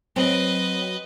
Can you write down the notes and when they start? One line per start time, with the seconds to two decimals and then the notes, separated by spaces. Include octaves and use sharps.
0.16 F#3 C4 B4 D#5